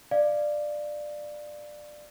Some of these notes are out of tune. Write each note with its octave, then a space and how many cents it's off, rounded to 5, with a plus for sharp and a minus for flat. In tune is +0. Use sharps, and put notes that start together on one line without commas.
D5 +15 F5 -15